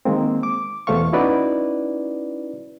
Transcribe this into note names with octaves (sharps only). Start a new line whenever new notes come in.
D#3 G#3 A#3 C4
D6
E2 B2 A3 C5 F5 C#6
C#4 D#4 E4 F#4 B4 D5